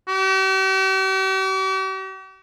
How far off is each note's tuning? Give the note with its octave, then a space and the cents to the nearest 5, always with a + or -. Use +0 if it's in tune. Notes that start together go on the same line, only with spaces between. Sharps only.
G4 -45